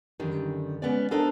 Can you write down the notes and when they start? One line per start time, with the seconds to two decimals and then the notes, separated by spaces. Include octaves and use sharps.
0.20 F#2 D3 D#3 G3
0.82 G#3 B3 C#4 D5
1.11 B3 D4 D#4 A4 A#4 C5